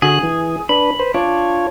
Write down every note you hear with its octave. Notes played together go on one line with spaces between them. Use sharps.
D3 F#4 G#4 F#6
E3
D4 B4 B5
B4 C5
D4 F4 C#5